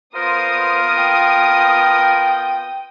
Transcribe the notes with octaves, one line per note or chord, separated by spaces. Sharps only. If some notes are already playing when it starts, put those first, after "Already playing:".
B3 F4 A#4 C5 D#6
G5